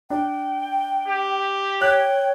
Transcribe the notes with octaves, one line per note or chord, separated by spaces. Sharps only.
D4 G5
G4
C#5 G5 F#6